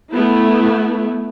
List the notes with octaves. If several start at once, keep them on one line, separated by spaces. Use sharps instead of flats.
A3 B3 E4